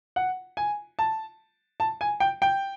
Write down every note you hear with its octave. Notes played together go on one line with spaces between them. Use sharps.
F#5
G#5
A5
A5
G#5
G5
G5